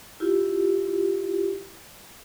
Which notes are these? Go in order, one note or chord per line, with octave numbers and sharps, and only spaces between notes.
E4 F4 G4